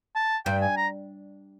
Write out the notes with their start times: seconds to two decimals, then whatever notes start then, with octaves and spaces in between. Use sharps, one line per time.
0.16 A5
0.46 G2 G5
0.61 G#5
0.77 A#5